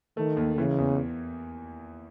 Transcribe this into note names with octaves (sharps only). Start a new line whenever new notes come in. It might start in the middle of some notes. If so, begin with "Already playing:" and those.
D#3 A3
D#2
C#3 E3
E2